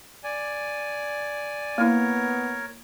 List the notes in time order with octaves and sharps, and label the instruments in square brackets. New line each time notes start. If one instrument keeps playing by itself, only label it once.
[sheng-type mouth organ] D5 G#5
[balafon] A#3 E4 [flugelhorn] B3 [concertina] A#4 C#5